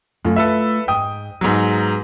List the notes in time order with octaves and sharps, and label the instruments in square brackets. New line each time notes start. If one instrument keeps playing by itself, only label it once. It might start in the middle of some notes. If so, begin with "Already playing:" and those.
[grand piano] F#2 [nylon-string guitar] A3 F4
[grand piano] A4 B4 E5
[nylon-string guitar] G#2 [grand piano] G5 D#6
[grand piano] G#2 F#3 [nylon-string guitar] G#3 B3 G#4